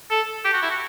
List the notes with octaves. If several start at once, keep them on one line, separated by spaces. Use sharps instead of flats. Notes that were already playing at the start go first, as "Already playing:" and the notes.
A4
G4
F#4
E4
F#4